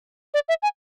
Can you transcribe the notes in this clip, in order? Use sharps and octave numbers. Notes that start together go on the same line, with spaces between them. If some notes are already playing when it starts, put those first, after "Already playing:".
D5
E5
G#5